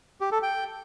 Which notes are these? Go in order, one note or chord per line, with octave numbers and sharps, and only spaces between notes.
G4
A4
G5